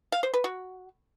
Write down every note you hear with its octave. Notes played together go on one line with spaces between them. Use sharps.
F5
C5
B4
F#4